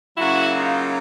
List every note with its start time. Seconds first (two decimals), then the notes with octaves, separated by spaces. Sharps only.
0.17 C#3 F#3 A#3 E4 F#4
0.54 D#4 F4